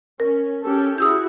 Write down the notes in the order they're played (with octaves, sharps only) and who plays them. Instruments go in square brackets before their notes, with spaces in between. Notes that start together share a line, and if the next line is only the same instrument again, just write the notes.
[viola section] C#4 [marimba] A#4
[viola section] C#4 G4 A4
[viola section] E4 F#4 G#4 [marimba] D#6 E6 G6